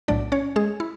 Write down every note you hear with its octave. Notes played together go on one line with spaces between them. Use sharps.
B1 A2 F#3 A3 D4 D5
C#4 C#5
G#3 G#4
E4